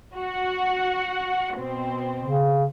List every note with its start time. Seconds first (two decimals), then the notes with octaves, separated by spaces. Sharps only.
0.15 F#4 F#5
1.57 B2 C4
2.22 C#3